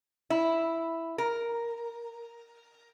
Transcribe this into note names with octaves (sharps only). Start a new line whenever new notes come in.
E4
A#4